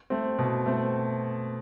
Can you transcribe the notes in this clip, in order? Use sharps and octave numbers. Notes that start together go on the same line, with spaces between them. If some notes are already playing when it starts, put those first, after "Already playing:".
A3 C4
B2
A3 C4